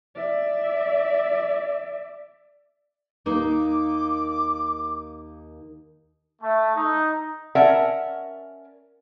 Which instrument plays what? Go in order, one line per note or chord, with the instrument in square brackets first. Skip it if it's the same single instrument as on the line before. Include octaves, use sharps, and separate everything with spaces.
[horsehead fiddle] D5 E5
[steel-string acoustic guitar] D#2 A#3 D#4 [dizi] D6
[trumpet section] A3
D#4
[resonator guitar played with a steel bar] C#4 A#4 D5 E5 F#5 A5